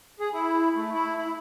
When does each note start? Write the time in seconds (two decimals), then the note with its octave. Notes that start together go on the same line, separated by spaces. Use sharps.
0.19 G#4
0.34 E4
0.76 A3
0.93 E4
1.18 E4